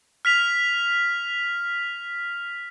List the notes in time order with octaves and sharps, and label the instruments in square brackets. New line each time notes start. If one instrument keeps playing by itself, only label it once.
[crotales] F6 B6 F7